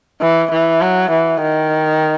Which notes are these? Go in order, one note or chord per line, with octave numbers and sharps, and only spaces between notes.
E3
E3
F#3
E3
D#3